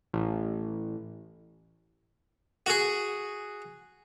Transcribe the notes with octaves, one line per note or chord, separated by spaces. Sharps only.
A1
F#4 G#4